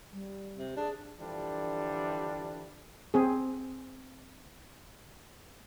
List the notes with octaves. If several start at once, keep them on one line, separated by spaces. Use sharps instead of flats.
G3
C3
D4 G#4
D3 E3 F3 G3 D4
C4 G#4